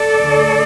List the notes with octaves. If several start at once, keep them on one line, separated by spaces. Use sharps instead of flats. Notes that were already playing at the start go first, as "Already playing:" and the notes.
Already playing: A4 D5
D2 D3 A3